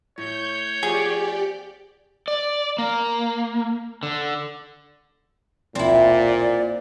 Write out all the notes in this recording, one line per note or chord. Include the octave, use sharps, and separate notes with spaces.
A2 A3 C#5 G6
F3 B3 G4 G#4 D5
D5
A#3
D3
D#1 B1 A#2 C4 E4 D5